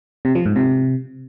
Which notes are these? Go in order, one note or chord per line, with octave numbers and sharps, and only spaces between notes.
C3
F3
G#2
C3